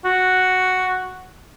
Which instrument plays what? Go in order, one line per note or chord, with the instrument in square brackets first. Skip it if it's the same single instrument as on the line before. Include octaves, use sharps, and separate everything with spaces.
[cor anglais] F#4